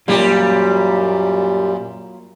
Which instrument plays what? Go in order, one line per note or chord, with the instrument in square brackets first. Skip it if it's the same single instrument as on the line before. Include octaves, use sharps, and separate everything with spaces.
[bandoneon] F#2 A#2 [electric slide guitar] F#3 A#3 F4 [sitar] G3 G4